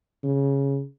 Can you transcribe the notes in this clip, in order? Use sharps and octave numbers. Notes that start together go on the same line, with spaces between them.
C#3